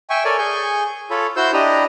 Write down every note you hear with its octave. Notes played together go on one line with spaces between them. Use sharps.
E5 G5 G#5 C#6
A4 A#4 C#5 D5 G#5
G#4 G#5 C#6 G6
F4 A4 C#5 B5
E4 F#4 C5 C6 E6 G6
D4 E4 G4 D#5 A#5